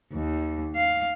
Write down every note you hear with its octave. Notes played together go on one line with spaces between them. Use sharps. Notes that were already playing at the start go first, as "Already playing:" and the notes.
D#2
F5